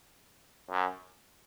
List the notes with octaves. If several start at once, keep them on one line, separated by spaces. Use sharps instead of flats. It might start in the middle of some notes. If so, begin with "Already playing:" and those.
F#2